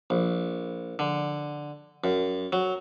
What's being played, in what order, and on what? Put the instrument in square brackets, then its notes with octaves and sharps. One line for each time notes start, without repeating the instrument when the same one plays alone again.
[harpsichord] A#1
D3
F#2
F#3